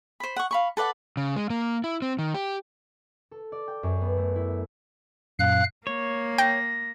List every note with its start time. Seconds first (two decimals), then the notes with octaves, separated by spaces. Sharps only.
0.20 C5 B5
0.36 F#5 C#6
0.51 F5 B5 C#6
0.77 A4 B4 D5 F#5
1.17 C#3
1.36 G#3
1.50 A#3
1.84 E4
2.02 C4
2.19 D#3
2.34 G4
3.31 A4
3.52 D5
3.68 G5
3.83 F#2
4.01 B3
4.17 A3
4.35 E4
5.39 F#2 A#2 F5 F#6
5.87 A#3 C#5
6.38 G5 A#6